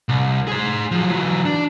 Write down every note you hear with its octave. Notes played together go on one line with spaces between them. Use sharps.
C2
G#4 C5
F3 F#3
E3 F#3
D4